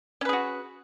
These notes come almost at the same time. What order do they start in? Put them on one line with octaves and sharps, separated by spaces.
C#4 B4 G#4 F#4